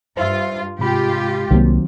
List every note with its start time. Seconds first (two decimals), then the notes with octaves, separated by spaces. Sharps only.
0.17 G2 F4 C5 E5
0.79 G#2 C3 G#3 F4 G4 B5
1.51 C2 D#3 F#3 A#3 C4